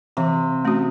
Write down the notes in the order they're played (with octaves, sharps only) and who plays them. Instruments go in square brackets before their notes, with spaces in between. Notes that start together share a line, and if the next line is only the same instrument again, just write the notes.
[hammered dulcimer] C3 [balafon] E3
[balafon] A3 C#4 F#4